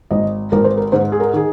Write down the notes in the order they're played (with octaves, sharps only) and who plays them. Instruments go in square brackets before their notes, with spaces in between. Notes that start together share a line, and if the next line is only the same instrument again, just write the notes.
[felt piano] G#1 D#5
G#1 A#4
C5
A#4
G#2 C5
G#4
A#4
D#3 G#4